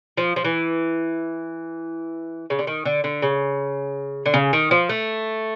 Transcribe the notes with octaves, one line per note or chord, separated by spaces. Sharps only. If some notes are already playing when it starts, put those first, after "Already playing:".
F3
F3
E3
C#3
D3
D#3
D3
D3
C#3
D3
C#3
D#3
F3
A3